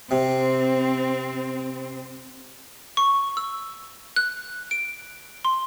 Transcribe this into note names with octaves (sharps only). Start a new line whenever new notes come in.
C3 C4
C#6
E6
F#6
D7
C6